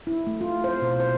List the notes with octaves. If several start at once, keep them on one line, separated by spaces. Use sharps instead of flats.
E4
A3
F4
C5
B2
C5